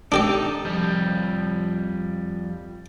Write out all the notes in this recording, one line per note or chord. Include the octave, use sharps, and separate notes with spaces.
D4 D#4 G4 A4 D5
F2 F3 G3